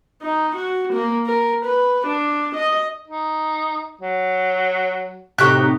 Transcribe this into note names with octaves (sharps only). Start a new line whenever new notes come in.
D#4
F#4
A#3
A#4
B4
D4
D#5
D#4
F#3
A2 C3 D#4 F#4 G4 F#6